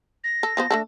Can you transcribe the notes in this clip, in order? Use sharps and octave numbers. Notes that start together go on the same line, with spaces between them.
A#6
A4
F3 B3 C5
A3 D4 A4